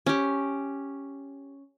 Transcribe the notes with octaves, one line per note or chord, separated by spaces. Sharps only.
C#4 G4